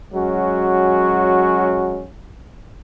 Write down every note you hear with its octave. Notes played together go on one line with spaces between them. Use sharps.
F#3 G#3 C#4 F#4